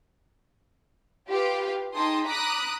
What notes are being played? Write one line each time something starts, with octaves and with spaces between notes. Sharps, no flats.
F4 G4 B4 F5
D#4 G#4 G5 A5 C6 D#6
A#5 B5 D6 D#6 F#6 B6